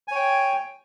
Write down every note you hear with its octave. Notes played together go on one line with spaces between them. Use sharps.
C#5 G5 G#5